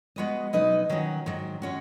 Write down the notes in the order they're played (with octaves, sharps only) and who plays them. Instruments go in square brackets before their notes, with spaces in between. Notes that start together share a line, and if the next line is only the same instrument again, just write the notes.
[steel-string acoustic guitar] G#3 B3 F#4 B4 D#5
B2 F#3 D#4 B4 D#5
D#3 F#3 C#4 F#4
G#2 D#3 F#3
G#3 C#4 F#4